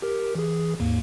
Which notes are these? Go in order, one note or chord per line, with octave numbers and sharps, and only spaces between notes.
G4 A#4
E3 G#4
D#2 G#2 A#3